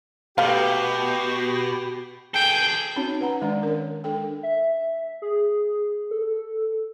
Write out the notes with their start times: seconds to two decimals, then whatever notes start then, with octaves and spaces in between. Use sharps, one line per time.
0.38 B2 A3 G4 F5
2.34 G#4 A4 G5
2.96 C4 C#4 D#4 F#4 C#5
3.21 B4 F#5 A#5
3.41 D#3 G#3 C#4 D4 D5
3.63 A#4 C#5
4.04 G#3 D4 A4 G5
4.43 E5
5.22 G#4
6.11 A4